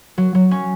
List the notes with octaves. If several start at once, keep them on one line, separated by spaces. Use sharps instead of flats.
F#3
F#3
C#4